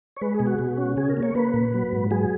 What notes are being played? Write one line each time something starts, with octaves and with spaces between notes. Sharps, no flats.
C#5
G#3 B4
G#4
B2
F#4
B2
C#4
C#3 G#4
A#4
A#3
C#5
A#3 B4
A#2
F#3
G#2
F#3 G#4